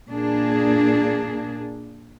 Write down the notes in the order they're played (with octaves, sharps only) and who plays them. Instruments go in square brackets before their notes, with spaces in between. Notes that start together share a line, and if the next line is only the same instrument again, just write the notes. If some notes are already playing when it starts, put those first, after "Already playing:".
[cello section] A#2 A#3 D4 G#4